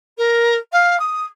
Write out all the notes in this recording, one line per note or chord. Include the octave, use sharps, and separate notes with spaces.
A#4
F5
D#6